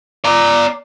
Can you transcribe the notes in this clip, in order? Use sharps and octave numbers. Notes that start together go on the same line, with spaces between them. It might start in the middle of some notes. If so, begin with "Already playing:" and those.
D5 A#5